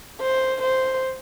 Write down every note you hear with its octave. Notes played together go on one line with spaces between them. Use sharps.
C5
C5